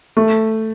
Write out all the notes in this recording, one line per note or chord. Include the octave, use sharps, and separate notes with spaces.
A3